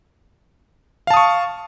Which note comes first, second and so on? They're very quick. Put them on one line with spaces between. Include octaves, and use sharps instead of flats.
F5 A5 D#6 C#6